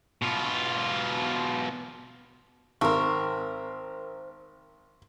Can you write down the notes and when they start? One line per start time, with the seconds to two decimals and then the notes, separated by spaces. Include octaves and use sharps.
0.22 B2 F4
2.81 G#1 C4 A#4 C6 C#6